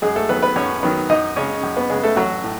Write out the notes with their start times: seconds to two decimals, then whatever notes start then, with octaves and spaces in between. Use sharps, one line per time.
0.02 F#2 G#3 G#4
0.16 A3 A4
0.29 D#3 F#3 B3 B4
0.42 B3 B4
0.56 F#2 C#4 C#5
0.83 D#3 F#3 B3
1.09 F#2 D#4 D#5
1.36 C#3 G#3 C#4 C#5
1.63 F#2
1.77 B3 B4
1.90 C#3 G#3 G#4
2.03 A3 A4
2.16 A1 F#3 F#4
2.44 A2